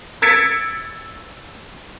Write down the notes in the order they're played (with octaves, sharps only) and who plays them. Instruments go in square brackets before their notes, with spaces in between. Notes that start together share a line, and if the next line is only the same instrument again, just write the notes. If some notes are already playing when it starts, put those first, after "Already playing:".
[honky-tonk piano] E6 G#6 A6 B6 C#7 D7